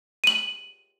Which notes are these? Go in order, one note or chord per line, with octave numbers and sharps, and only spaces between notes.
D#7 F#7